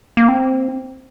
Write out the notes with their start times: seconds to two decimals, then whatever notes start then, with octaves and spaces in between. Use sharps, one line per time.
0.17 A#3
0.29 C4